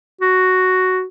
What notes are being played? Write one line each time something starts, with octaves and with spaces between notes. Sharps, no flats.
F#4